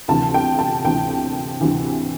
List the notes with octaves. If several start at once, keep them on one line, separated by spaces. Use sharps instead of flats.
D2 C3 E3 A5
G5
A5
D2 C3 E3 G5
D2 C3 E3